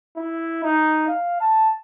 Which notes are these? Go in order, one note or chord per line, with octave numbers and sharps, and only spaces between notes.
E4
D#4
F5
A5